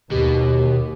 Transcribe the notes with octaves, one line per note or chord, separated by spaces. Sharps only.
D#2 B2 G4